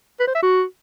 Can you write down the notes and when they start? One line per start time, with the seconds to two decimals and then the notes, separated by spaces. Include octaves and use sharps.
0.20 B4
0.27 C5
0.35 E5
0.43 F#4